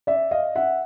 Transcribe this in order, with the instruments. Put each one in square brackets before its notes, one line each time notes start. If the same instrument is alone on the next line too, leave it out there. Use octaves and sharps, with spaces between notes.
[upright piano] D5 E5
D#5 F5
E5 F#5